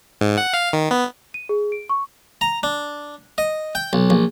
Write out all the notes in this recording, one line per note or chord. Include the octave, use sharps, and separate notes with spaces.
G#2
F#5
F5
D#3
B3
D#7
G#4
D7
C#6
A#5
D4
D#5
G5
B1
A#1